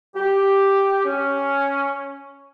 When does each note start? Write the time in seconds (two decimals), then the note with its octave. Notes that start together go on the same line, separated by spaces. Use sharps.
0.16 G4
1.05 C#4